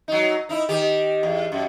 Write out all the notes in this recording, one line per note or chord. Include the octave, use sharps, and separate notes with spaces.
F#3 D#4
D#4 E4
D#3 G4
E2
F#2